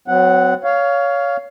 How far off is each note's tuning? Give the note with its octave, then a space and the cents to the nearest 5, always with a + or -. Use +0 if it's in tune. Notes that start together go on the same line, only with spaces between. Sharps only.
F#3 +0 C4 -40 F#5 +0
C#5 +20 F5 +0